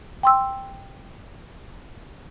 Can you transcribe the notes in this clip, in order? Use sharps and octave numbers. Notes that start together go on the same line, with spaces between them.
G5 C6 E6